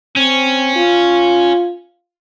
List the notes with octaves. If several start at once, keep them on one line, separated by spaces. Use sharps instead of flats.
C4 C#4
F4